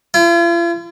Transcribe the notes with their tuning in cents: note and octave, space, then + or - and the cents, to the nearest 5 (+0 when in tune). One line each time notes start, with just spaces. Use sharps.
F4 -45